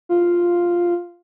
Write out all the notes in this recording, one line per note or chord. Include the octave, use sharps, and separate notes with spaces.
F4